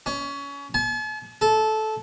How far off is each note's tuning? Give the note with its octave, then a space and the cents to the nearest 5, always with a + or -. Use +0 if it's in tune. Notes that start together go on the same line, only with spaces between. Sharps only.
C#4 +25
A5 -45
A4 -15